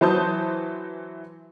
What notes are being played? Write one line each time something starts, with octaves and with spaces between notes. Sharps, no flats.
E3 F#3 C5 A5 D#6 G6